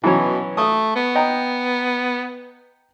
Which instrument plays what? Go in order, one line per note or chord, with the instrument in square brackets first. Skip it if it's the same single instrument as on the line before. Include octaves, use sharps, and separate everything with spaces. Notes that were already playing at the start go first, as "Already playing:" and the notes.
[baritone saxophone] B2 [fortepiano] E3 F#3 C#4
[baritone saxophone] A3 [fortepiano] D#6
[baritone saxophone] B3
[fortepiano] D#5 G5 A#5